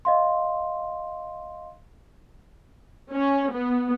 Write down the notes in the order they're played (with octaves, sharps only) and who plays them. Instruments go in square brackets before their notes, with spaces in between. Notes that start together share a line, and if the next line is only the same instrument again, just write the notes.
[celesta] D#5 F5 C6
[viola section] C#4
B3